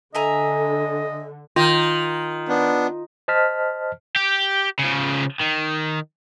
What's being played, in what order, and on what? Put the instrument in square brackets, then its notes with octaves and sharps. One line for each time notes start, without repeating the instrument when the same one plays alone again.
[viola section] D3 [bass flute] A4 [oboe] D#5 [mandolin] E5 G#5 A#5
[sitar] D#3 [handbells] F4
[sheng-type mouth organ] B3 D4
[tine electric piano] C5 D#5 A5 F6 B6
[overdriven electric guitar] G4
C#3 F3
D#3